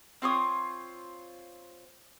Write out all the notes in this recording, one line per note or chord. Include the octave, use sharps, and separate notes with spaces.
C4 F4 C#5 D#6